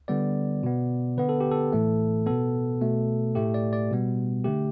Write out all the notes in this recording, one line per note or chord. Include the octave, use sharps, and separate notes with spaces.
D3 G3 B3 D5
B2 B3
D3 B3 B4
A4
G4
A4
A2 E3 A3
B2 B3 A4
B2 A3
A2 A3 G4
D5
D5
B2 G3 B3
D3 A3 G4